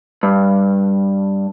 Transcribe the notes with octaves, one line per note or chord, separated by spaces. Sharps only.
G2